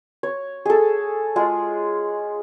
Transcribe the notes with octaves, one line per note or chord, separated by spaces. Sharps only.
C#5
G#4 A4
G#3 F4 G#4